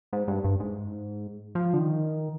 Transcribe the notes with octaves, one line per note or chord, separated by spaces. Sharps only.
G#2
G2
G2
G#2
F3
D3
D#3